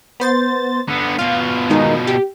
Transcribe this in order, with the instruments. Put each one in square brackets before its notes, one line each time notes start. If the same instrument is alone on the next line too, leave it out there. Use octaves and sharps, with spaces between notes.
[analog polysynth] B3 C5 A6
[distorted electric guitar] D3 B3
[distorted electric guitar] B2 F4 [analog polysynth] F5
[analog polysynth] D#3 G#3 D#4
G4